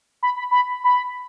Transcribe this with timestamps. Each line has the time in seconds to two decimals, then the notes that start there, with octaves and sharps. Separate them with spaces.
0.23 B5
0.36 B5
0.51 B5
0.84 B5